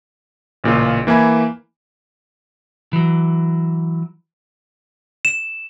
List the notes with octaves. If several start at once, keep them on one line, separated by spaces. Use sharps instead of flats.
A1 A#2 C#3 F4
E3 A#3 E4 G#5 B5
E3 F#3
E7